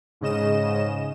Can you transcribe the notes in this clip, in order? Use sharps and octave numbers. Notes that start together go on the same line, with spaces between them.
G#2 C#3 D#5 E7